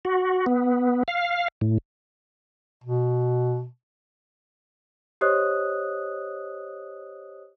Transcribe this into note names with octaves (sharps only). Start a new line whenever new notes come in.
F#4
B3
F5
A2
B2
G4 C5 C#5 D#5 D#6 F#6